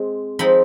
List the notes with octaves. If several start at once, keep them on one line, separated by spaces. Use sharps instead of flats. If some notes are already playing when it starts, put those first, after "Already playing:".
Already playing: G#3 C4
F3 G#3 C4 D#4 B5